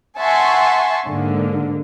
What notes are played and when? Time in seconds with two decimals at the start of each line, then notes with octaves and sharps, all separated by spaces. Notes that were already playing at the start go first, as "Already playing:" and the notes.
0.19 E5 F#5 G#5 A5 C6 C#6
1.08 G#2 D3 A#3